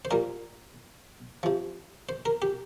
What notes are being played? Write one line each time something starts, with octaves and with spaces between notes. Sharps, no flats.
C5
A#2 G3 A#4
C3 F3
C5
A#4
G4